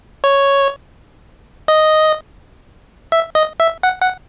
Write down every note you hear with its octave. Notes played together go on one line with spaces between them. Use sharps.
C#5
D#5
E5
D#5
E5
F#5
F#5